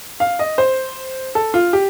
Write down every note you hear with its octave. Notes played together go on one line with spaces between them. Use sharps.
F5
D#5
C5
A4
F4
G4